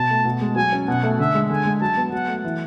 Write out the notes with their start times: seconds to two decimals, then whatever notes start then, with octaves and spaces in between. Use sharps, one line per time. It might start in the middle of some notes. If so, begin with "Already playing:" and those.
Already playing: B2 A5
0.10 A3
0.25 B2
0.41 G#3
0.56 F#3 G#5
0.72 C#4
0.88 B2 F#5
1.03 A3
1.19 D3 E5
1.35 G#3
1.50 D3 G#5
1.66 G#3
1.81 F#3 A5
1.97 B3
2.12 F#3 F#5
2.28 A3
2.44 E3